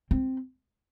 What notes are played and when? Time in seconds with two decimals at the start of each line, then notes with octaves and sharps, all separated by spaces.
0.11 C4